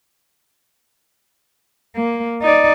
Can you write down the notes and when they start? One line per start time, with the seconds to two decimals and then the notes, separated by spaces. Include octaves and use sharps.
1.96 A#3
2.42 D#4 D5